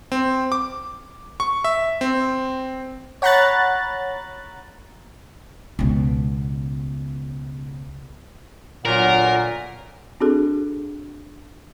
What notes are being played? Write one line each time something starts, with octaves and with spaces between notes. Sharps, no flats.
C4
D6
C#6
E5
C4
C#5 F#5 A#5 B5 F#6 A6
C#2 B2
G1 A#2 F#3 A#4 F#5
C4 D4 F#4 G#4 A4